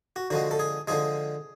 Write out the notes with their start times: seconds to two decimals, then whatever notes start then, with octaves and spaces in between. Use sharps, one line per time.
0.16 F#4
0.30 D3 F3 G#3 F#4
0.51 A4
0.59 G#4
0.88 D3 F3 G#3 G#4